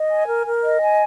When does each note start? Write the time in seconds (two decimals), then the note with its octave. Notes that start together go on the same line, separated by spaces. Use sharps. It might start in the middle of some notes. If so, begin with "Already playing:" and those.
Already playing: D#5
0.10 G#5
0.28 A#4
0.45 A#4
0.63 D#5
0.81 G#5